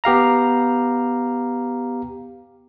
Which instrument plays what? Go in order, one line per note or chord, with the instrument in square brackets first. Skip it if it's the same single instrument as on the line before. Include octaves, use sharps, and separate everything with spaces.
[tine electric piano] B3 G4 F5 A#5